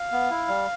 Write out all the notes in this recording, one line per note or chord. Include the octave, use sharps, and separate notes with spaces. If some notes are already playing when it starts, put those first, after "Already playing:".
Already playing: F5
B3
E4
G3